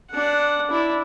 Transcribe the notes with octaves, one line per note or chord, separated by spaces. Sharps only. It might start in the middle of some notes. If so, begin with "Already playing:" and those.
D4 F#5
D4 E4